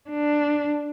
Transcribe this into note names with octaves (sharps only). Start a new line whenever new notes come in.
D4